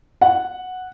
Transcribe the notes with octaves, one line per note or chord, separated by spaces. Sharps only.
F#5